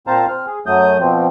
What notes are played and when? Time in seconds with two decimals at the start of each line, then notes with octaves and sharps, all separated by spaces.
0.07 A#2 C4 C5 F5 A5 A#5
0.29 C4 F6
0.46 G#4
0.66 F#2 F#3 A3 D#6 G6
1.00 B2 F3 C4